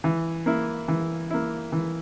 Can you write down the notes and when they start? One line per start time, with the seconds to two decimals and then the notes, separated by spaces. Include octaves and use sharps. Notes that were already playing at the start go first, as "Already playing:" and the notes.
0.04 E3
0.46 A#3 E4
0.88 E3
1.31 A#3 E4
1.72 E3